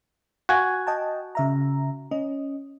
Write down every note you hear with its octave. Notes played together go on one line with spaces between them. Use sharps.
F#4 F5 G#5
D#5 G5 A5
C#3 E5 A#5
C#4 D#5